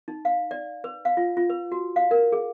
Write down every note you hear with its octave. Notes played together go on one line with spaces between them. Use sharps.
D#4
F5
D5
B4
F5
F4
F4
B4
F#4
F5
A#4
G#4